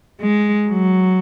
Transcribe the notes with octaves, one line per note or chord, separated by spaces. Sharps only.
G#3
F#3